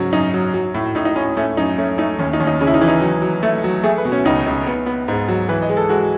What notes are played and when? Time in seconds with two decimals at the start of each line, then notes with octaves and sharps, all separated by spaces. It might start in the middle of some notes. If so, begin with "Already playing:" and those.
Already playing: G#2 C#3 F#3 C#4
0.13 F#2 D#4
0.34 F#3
0.54 F#3
0.74 A2
0.95 A2 D#4
1.05 D#4
1.15 A2 C#4
1.37 A3 C#4
1.57 F#2 D#4
1.78 A3 C#4
1.98 A3 D#4
2.19 D#2 C#4
2.33 D#4
2.40 D#2 C#4
2.47 D#4
2.61 C#3 C#4
2.67 E4
2.74 D#4
2.81 E3
2.88 D#4
3.01 F#3
3.22 F#3
3.43 A3
3.64 F#3
3.84 A3 G#4
3.98 B4
4.05 B2
4.12 C#4
4.25 C#2 D#4
4.46 C#2
4.67 B3
4.86 B3
5.08 G#2
5.28 F#3
5.49 E3 B4
5.62 D#5
5.69 G#3
5.77 A4
5.89 G#3 F#4